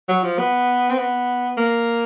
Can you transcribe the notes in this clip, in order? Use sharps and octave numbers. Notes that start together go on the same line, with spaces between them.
F#3
F3
B3
C4
B3
A#3